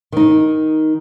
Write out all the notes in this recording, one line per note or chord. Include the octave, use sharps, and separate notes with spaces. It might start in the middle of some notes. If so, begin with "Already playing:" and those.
D#3 D#4